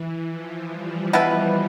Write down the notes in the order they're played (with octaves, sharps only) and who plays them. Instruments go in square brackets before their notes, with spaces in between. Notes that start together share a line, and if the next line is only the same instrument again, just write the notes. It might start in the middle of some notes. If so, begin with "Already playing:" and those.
Already playing: [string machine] E3
F3
G3
[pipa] B2 B3 E4 B4